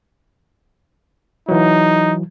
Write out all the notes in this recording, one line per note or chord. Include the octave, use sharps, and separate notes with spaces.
E3 F#3 D#4